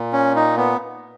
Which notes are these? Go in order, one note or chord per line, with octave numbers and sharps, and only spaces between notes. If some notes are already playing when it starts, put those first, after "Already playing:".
Already playing: A#2
C#4
D#4
B3